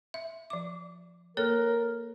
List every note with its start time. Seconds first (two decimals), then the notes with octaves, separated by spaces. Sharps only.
0.14 E5
0.50 F3 D6
1.37 A#3 A4 A#4 C#5